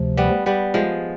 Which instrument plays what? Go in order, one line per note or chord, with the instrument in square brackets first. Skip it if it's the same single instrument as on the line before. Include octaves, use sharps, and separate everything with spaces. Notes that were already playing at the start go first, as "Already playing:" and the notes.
Already playing: [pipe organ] D2 C3 F3
[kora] G3 B3
G3 B3
F3 G#3